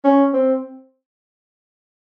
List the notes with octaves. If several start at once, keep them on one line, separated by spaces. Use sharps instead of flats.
C#4
C4